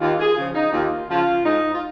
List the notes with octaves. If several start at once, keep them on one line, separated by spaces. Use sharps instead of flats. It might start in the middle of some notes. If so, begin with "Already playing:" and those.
D#2 F4
G#4
C#3 F3 F4
D#4
D#2 F4
C#3 F3 F4
G#2 D#4
F4